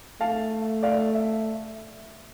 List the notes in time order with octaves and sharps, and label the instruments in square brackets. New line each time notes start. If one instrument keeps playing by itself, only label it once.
[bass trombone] A3 [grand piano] F5 A5
[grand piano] D5 F5
E5